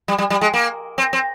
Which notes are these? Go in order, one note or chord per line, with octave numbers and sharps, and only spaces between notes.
G3
G3
G3
G#3
A#3
C4
C4